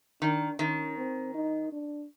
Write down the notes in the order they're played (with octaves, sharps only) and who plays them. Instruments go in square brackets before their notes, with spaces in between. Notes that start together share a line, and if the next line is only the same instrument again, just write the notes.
[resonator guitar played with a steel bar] D#3 [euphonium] D4
[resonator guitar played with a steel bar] D#3 [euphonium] C#4
[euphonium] C4
D#4
D4